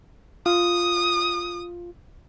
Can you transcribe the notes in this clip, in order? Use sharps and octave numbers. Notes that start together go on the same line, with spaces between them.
F4 D#6